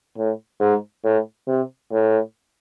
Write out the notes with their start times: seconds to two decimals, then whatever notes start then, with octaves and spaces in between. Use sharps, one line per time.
0.17 A2
0.61 G#2
1.04 A2
1.47 C3
1.92 A2